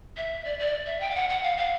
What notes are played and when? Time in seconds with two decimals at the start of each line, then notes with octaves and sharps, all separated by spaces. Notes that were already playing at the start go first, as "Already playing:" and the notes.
0.16 E5
0.45 D5
0.59 D5
0.86 E5
1.00 G5
1.11 F5
1.14 F#5
1.29 F#5
1.43 F5
1.57 F5